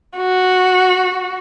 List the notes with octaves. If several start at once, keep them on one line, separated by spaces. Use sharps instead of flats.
F#4